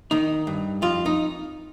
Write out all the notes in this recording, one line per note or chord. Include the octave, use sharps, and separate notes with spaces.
D#3 D#4
G2
F2 F4
D#4